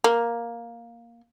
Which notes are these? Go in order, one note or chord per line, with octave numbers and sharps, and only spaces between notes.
A#3